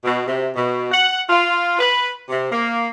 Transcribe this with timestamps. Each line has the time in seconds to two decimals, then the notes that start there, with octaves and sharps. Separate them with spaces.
0.04 B2
0.26 C3
0.55 B2
0.91 F#5
1.29 F4
1.79 B4
2.29 C3
2.52 A#3